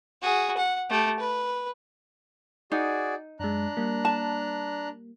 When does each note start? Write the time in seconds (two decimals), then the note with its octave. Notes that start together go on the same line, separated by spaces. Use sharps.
0.22 F#4 G#4
0.57 F#5
0.90 A3 G4
1.19 B4
2.72 D#4 F#4 G#4 D5
3.40 F#2 G#3 D4 A#5 F#6
3.77 G3 A#3
4.05 A5